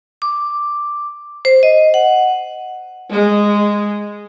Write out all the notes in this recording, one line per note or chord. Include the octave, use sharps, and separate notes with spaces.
D6
C5
D#5
F#5
G#3